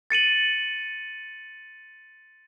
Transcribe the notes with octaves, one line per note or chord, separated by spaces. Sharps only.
A6 C#7 D#7 F#7